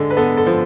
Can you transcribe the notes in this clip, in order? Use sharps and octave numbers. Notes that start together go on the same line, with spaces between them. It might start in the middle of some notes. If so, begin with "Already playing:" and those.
Already playing: D3 G#3 A4
B4
B3 A4
A4
F3